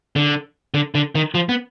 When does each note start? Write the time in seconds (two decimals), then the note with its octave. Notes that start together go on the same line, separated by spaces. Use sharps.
0.16 D3
0.74 D3
0.95 D3
1.15 D#3
1.35 F3
1.49 B3